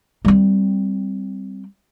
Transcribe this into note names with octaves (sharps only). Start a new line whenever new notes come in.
G3 C4